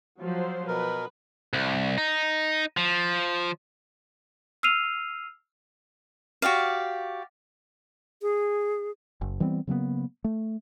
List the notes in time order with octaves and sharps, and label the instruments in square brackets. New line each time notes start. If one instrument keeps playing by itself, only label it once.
[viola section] F3 F#3 C5
[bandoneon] B2 A#4 [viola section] B4
[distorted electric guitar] C2
D#4
F3
[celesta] E6 F6 C7 D#7 F7
[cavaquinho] F#4 G4 D5 F5
[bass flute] G#4
[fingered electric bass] F#1
E3 G3 B3 C4
C#3 F#3 A#3 B3
A3